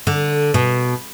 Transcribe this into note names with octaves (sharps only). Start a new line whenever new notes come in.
D3
B2